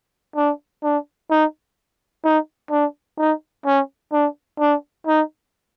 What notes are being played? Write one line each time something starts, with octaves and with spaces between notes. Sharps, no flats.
D4
D4
D#4
D#4
D4
D#4
C#4
D4
D4
D#4